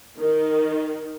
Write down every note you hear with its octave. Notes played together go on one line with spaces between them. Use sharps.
D#3